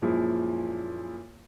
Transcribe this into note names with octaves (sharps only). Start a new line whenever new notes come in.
F#2 A#2 F3 G#3 E4